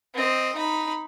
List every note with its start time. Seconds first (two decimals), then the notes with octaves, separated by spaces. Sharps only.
0.14 C4 D#5
0.56 D#4 B5